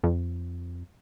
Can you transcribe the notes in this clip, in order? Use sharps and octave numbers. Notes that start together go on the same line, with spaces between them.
F2